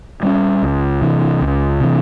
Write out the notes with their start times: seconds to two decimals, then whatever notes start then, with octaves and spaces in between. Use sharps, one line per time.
0.23 G3 A#3 C#4
0.63 C#2
1.02 C3 E3
1.41 C#2
1.80 C3 E3